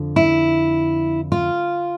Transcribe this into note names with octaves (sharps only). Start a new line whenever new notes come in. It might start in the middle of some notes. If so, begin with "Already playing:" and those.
Already playing: F2 D3
E4
F4